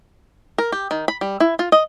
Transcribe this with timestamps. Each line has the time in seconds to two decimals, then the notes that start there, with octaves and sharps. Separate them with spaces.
0.58 A#4
0.72 G4
0.91 D#3
1.08 B5
1.21 G3
1.40 E4
1.59 F4
1.72 D#5